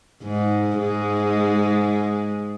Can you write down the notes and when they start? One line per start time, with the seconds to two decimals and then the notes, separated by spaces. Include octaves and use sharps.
0.23 G#2 G#3
0.78 G#2 G#3